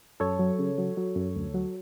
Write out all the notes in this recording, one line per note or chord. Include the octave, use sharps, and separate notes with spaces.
F#2 A4 C#5
F#3
C#3
F#3
F#3
F#2
D2
F#3